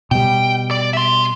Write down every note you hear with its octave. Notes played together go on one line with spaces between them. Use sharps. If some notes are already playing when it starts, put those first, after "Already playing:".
B2 G3 G5
D5
E5 C6